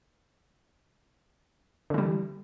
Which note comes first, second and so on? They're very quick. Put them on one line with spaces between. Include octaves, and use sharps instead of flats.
D3 E3 G3